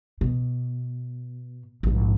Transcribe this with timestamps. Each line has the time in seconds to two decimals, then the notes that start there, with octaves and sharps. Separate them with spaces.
0.21 B2
1.83 A#1 G#2